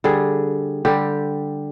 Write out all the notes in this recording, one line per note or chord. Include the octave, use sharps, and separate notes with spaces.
D3 G3 G#4
D3 G3 G4